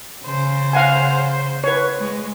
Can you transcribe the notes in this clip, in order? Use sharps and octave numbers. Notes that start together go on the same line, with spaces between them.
C#3 C5
F5 F#5 G#5
B4 C#5
G#3